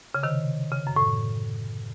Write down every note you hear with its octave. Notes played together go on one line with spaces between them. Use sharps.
C#3
C3 D#3
C#3
F#2
A2